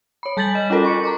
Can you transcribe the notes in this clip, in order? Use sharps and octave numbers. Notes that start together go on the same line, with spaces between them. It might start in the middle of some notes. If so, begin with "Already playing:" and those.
C#5 B5
G3 A5 G6 A6 B6 F#7
D#5
C#4 F4 F#4 A4 A#4
C#6 C#7
A#5 C6 D6